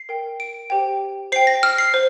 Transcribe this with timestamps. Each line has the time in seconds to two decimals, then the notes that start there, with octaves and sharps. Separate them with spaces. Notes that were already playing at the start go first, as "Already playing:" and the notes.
Already playing: C7
0.09 A#4 G5
0.40 D7
0.70 G4 C5 G5
1.32 C5 G5 C7
1.47 A#6
1.63 F6
1.78 C7
1.94 C5